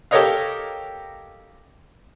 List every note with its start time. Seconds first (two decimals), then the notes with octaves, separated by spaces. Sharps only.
0.11 G4 A4 A#4 C#5 D#5 F5